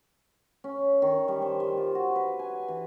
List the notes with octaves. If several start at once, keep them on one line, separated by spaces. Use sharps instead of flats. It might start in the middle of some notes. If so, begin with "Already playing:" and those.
C#4
D#3
G3
C5
G3
F4
F#4
B4
G#5
E3